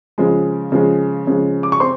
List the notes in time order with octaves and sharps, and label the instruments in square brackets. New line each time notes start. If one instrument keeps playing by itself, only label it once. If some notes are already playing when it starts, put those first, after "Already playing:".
[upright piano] C#3 F3 G#3
C#3 F3 G#3
C#3 F3 G#3
D6
C#6
C4 C6